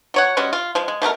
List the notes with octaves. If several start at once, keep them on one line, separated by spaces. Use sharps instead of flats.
F#3 C#5 F#5
G3 G#3 C#4 F#4
F4
F3 G#3
G#3
B2 A3 D#4 A#4